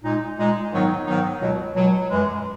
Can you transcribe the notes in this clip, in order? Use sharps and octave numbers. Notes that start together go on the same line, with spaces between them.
A#2 G#3 D#4
A#2 G#3 D#4
G#2 D#3 F#3 B3 D#4
G#2 D#3 F#3 B3 D#4
C#2 B2 F#3
C#2 B2 F#3
F#2 E3 G#3